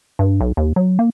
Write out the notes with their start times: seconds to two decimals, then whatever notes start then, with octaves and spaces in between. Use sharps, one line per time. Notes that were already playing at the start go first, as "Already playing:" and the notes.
0.19 G2
0.41 B1
0.57 D#2
0.76 F#3
0.99 A#3